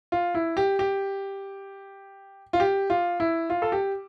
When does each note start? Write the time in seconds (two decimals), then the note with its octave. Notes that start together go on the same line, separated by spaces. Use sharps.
0.12 F4
0.35 E4
0.57 G4
0.79 G4
2.53 F4
2.60 G4
2.90 F4
3.20 E4
3.50 F4
3.62 A4
3.72 G4